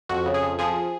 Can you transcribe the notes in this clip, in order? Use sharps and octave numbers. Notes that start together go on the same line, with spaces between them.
F2 F#4
C#3
G#4
F2
F3 G#4